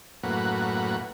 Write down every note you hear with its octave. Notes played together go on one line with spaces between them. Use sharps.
F#2 A2 A#3 B4 F#5